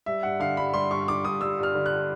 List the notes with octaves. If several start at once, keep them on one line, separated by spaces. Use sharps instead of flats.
G3 E5
G2 F#5
D3 F5
G2 B5
G3 C6
G2 C#6
D3 D6
G2 D#6
G3 E6
G2
F6
D3
F#6